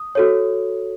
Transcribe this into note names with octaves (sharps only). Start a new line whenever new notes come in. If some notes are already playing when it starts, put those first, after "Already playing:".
Already playing: D#6
F#4 A4 C#5